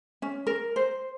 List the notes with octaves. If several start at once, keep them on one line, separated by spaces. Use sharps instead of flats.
C#4
A#4
C5